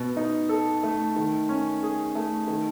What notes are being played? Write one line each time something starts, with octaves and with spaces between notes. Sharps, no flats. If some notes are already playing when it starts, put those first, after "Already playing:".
Already playing: B2
D#4
A4
A3
D#3
C#4
G#4
A3
D#3